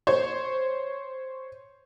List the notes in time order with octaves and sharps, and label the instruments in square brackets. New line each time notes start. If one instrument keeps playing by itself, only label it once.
[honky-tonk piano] C5 C#5